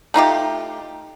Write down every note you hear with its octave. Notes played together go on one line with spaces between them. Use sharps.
A3 D#4 F4 G4